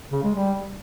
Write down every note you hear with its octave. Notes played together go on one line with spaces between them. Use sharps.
C#3
G#3
G3